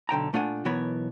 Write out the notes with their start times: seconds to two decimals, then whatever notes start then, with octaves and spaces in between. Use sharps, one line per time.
0.09 B1 D3 G5 A#5
0.33 A#2 A3 D4 F4 F#5 G#5
0.65 B1 E3 B3 A#4 C#5 B5